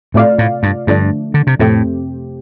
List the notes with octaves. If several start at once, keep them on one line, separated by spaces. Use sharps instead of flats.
A2 C3 A3 F4 D5 F5
A2
G2
G2 D3 F3 A3 D4
D3
C3
F2 A2 C3 A3 C4 G4